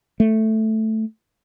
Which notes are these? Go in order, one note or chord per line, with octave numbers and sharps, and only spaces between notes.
A3